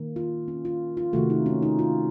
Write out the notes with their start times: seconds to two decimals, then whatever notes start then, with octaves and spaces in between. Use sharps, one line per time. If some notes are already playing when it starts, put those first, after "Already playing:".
Already playing: D#3 A#3
0.16 F4
0.48 C#4
0.65 F4
0.97 F4
1.13 C3 D#3 A3 F#4
1.30 D#4
1.46 C#4
1.62 D#4
1.79 F4